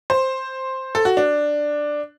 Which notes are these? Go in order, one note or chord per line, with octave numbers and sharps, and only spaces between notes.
C5
A4
F#4
D4